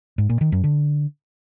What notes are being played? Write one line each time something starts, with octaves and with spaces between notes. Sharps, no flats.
G#2
A#2
D#3
F#2
D3